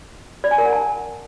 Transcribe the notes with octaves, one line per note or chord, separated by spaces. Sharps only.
D5
G#5
A#4
F#5
A5